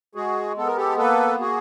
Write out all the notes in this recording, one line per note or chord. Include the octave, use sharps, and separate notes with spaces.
G#3 F#4 G#4
B3 A4
A#4
G4 A4
A#3 A4 B4
F#4 G#4